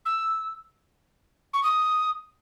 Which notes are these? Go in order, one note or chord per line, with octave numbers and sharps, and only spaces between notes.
E6
C#6
D#6